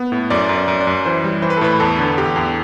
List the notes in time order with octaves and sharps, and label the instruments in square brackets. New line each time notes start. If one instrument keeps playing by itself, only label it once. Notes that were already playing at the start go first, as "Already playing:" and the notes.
Already playing: [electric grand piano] B3
A2
F#2 D5
F#2
D5
F#2
D5
F#2
E3 C5
G3
E3 C5
B4
A4
A2 B4
E2 A4
D3
E2 G4
E2